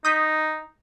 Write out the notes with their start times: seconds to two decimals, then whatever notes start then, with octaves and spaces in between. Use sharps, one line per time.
0.05 D#4 D#6 G6 B6